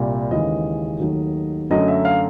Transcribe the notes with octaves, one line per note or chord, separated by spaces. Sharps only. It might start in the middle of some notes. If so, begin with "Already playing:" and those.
Already playing: C2 A#2 G3
D#2 C#3 E3 G#3 D#5
D#2 D#3 F#3 A3
F#2 D3 F#3 A3 D#5
E5
F5